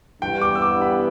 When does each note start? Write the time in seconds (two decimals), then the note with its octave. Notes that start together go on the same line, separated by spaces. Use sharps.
0.22 G2 E3 G3 B3 G5
0.41 D6
0.55 E6
0.62 D6
0.82 B5